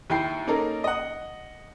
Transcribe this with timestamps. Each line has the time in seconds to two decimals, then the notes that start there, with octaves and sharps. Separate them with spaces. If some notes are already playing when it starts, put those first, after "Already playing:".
0.10 D#2 E4 G5 C7
0.47 A#3 C#4 D#4 A4 A#4
0.84 D#5 F#5